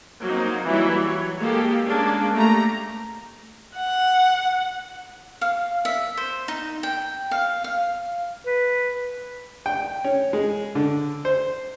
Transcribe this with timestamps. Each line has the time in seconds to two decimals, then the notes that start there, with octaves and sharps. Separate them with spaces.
0.24 F#3 A#3 C4 D#4
0.67 E3 F#3 G3 E4
1.03 F#3 C#5
1.40 G#3 A#3 G4 A4
1.87 G#3 A#3 C#4 D4
2.36 A3 A#3 G4 A#5
3.77 F#5
5.41 F5
5.85 E5
6.17 C5
6.48 D#4
6.83 G5
7.31 F5
7.64 F5
8.46 B4
9.66 G5
10.04 C#4
10.33 G#3
10.75 D3
11.25 C5